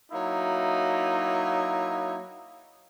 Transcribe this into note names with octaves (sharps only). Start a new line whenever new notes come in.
F#3 A#3 D#4 E4